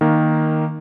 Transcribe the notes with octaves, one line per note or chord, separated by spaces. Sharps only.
D#3 A#3